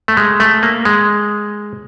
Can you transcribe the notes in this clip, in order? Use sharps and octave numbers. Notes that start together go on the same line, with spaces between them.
A3
G#3
A3
A#3
G#3